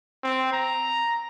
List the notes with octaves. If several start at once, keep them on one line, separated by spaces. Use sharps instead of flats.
C4
A#5